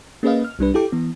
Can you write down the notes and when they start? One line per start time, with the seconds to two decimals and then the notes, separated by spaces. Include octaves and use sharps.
0.23 A#3 C#4 G#4 B4 D#5 F5
0.44 F6
0.59 C2 G3 D4 B4
0.74 E4 G4 A4 G5 D6
0.92 E3 B3